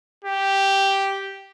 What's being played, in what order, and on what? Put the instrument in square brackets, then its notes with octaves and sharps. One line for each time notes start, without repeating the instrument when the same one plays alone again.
[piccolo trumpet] G4